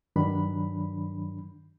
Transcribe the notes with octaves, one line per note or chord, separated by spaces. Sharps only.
G2 D#3 F#3 D4 B5